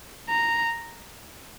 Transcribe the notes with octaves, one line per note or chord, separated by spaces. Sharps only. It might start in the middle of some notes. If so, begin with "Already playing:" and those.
A#5